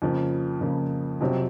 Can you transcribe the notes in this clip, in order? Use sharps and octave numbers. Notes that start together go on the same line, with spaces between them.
F2 C#3 F3 A#3
F2 C#3 F3 A#3
F2 C3 F#3 C4